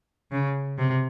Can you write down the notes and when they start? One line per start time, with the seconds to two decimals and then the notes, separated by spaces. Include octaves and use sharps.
0.32 C#3
0.78 C3